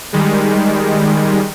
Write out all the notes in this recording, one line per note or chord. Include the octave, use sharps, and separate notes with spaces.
D#3 G3 G#3